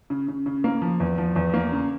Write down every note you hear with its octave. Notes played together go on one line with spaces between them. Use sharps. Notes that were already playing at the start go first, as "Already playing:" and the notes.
C#3
C#3
C#3
A#3
F3
E2
F3
E2
A#3
C#3